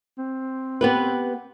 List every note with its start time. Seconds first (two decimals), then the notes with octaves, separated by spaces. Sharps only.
0.18 C4
0.81 B3 G4 B4